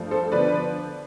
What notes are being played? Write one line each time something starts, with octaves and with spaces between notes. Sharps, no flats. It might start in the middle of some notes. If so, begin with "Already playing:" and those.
Already playing: G2 F3 A3
A4 C5
D3 F3 B3 B4 D5